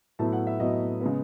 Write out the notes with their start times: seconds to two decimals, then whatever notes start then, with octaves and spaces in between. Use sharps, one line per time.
0.19 A2 F#3 B3 E4 A5
0.33 F#5
0.47 E5
0.60 A2 F#3 B3 E4 D#5
1.01 C#3 G#3 B3